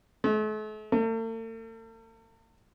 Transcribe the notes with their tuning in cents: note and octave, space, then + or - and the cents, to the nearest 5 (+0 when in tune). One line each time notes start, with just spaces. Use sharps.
A3 -45
A3 +45